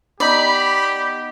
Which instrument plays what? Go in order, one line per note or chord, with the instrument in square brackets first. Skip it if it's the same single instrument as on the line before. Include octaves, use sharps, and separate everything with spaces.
[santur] B3 D#4 [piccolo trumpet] G4 [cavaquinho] D5 [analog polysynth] B5